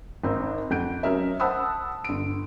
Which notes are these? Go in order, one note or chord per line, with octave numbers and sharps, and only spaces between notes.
G#1 C4 D#4
F2 F#5 G6 D7
F#3 C#4 A#4 D#5 E5
C5 F#5 A5 B5 D#6 E6
G1 D7